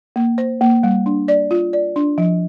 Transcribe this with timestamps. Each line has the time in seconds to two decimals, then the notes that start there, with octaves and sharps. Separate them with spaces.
0.16 A#3
0.38 C5
0.61 A#3
0.83 G3
1.06 D4
1.28 D5
1.51 F4
1.73 D5
1.96 D4
2.18 F3